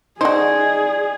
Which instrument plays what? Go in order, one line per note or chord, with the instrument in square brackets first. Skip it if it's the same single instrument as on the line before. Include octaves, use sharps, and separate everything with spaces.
[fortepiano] D#4 [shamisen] F#4 C5 [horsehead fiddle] G#4 [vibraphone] D5